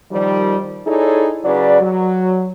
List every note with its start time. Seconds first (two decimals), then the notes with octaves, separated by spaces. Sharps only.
0.11 D#3 F3 G3
0.87 D#4 E4 G#4 A4 C#5 D5
1.44 C#3 F#3 B4 D5
1.81 F#3